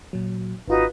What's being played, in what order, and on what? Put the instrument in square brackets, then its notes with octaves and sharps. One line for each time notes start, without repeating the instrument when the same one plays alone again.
[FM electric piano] A#2 F#3
[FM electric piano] G#1 F4 F#4 [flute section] D#4 B4